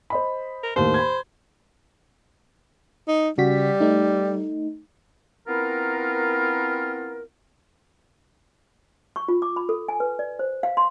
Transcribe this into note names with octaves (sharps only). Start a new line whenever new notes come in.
C5 D#5 B5
A#4
D#2 A2 D#3 C5
B5 G#6
D#4
C#3 G3 F#4 B6
A3 D#4
B3 C4 E4 F4 A#4
C#6
F4
D6
B5
A4
G#5
B4
D5
C5
F5
C6